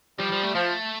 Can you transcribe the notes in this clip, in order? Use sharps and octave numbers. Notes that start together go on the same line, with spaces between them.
F3 G3
F3
A3
F3 A3